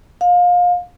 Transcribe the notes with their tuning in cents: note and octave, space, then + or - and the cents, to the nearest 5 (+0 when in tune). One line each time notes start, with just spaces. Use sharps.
F5 +25